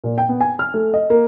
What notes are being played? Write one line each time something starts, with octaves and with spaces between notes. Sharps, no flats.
A#2
G5
B3
G#5
F6
A3
D#5
A#3